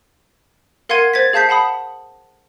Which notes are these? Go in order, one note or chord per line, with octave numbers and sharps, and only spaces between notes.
A#4 F5 F#5 C6 G#6 D#7
C5 G#6 A6 B6
G#4 F5 A5 G6 B6 C7
F#5 A5 B5 D#6